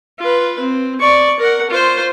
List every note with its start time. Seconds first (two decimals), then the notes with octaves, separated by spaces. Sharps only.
0.19 F4 B4
0.60 C4
1.00 D5 C#6
1.40 A#4 F#5
1.70 F4 C5